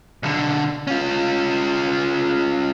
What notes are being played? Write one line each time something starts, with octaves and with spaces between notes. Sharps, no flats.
B1 D3
C#4 F4